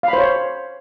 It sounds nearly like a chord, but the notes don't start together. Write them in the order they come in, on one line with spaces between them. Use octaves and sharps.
F5 B5 C5 C#5